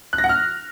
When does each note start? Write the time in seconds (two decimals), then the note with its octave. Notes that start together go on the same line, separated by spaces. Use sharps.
0.13 F#6
0.18 A#6
0.24 F#5
0.29 F6